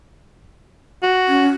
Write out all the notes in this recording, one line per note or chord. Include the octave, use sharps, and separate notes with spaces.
F#4
C#4